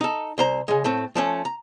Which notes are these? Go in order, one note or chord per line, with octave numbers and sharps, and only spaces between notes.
D#4 A4
C2 C5 A#5
C#3 G#3
A2 A3 C4
F3 A3 C#4
A#5